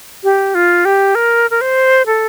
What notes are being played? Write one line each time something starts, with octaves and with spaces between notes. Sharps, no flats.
G4
F4
G4
A#4
A#4
C5
A4